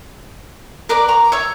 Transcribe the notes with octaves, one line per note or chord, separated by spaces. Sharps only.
A#4 B4 D5 D6
A#5 C#6 D6
C#5 E5 C#6